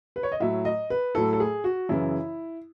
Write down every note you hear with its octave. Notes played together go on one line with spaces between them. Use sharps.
B4
C#5
D#5
A2 F#3 E5
D#5
B4
A2 F#3 A4
A4
G#4
F#4
F#2 C#3 E3 E4